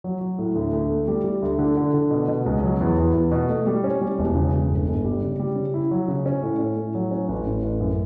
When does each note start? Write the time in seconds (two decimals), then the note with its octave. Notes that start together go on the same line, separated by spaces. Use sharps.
0.04 F#3
0.21 F#3
0.39 A2
0.56 D2
0.73 D2
0.90 A3
1.08 G3
1.24 G3
1.42 D2
1.59 D3
1.77 D3
1.94 D3
2.11 B2
2.28 B2
2.46 C#2
2.63 F#3
2.81 E2
2.98 E2
3.14 E2
3.32 B2
3.49 A3
3.67 G3
3.84 C#4
4.01 G3
4.19 E1
4.35 C#3
4.53 E1
4.70 G1
4.88 G1
5.04 G3
5.22 C#3
5.39 G3
5.56 C#3
5.74 E4
5.91 F#3
6.08 C#3
6.26 C#4
6.42 A2
6.59 C#4
6.76 A2
6.95 F#3
7.11 C#4
7.28 A1
7.47 A1
7.63 A1
7.81 F#2